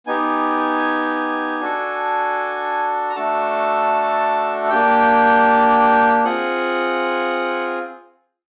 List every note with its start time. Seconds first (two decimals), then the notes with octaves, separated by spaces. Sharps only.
0.07 B3 D#4 G4 G#5
1.61 D4 F#4 A4
3.10 A#5
3.15 A3 D4 F#4 A4 A5
4.70 A#3 D4 G4 G5
6.24 C4 F4 G#4 F#5